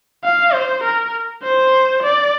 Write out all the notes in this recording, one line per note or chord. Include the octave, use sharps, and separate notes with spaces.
F5
C5
A#4
C5
D5